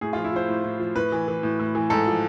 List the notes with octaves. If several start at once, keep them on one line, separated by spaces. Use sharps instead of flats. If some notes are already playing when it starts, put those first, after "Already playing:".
A2 G#4
F4
F3
E4
F3 C5
A2
A2
F3
A2 B4
E3
E3
A2
A2
E3
G#2 A4
F3